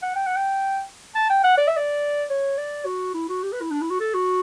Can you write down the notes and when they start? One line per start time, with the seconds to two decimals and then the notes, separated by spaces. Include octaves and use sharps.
0.02 F#5
0.16 G5
0.27 F#5
0.36 G5
1.15 A5
1.30 G5
1.44 F#5
1.58 D5
1.68 E5
1.77 D5
2.30 C#5
2.58 D5
2.85 F#4
3.14 E4
3.29 F#4
3.43 G4
3.53 B4
3.62 E4
3.71 D4
3.81 E4
3.90 F#4
4.00 A4
4.14 F#4